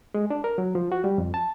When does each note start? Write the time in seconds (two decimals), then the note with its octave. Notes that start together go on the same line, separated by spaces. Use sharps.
0.14 G#3
0.30 D4
0.44 A#4
0.58 F#3
0.75 F3
0.92 F#4
1.04 G3
1.18 F2
1.34 A5